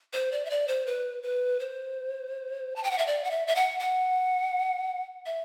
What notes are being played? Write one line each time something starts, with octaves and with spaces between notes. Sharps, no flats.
C5
D5
E5
D5
C5
B4
B4
C5
A5
G5
F#5
E5
D5
F#5
E5
E5
F#5
F#5
E5